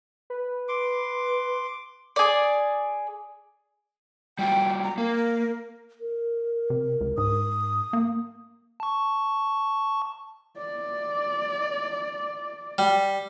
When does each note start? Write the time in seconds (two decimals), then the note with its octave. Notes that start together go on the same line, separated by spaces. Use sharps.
0.30 B4
0.69 C6 D6
2.16 G#4 D5
4.39 G3 F4 F#4 G5
4.84 A#5
4.98 A#3 A#4
6.01 A#4
6.70 C3
7.01 C#2
7.18 G#2 D#6
7.93 A#3
8.80 A5 C#6
10.58 D5
12.78 G3